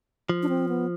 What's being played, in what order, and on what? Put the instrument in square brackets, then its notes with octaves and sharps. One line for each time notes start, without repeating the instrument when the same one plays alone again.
[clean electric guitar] F3
[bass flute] D4
C4
B3